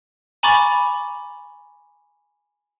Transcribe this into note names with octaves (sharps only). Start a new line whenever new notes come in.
G#5 A#5 B5 C#6 D6 A6